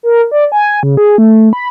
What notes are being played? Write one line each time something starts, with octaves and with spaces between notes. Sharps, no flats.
A#4
D5
G#5
C#3
G#4
A3
B5